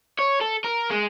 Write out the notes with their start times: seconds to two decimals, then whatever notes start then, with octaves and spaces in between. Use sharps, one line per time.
0.19 C#5
0.41 A4
0.64 A#4
0.90 G#3